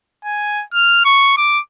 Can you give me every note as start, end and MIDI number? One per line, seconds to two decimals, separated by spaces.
0.25 0.64 80
0.74 1.02 89
1.05 1.36 85
1.38 1.60 86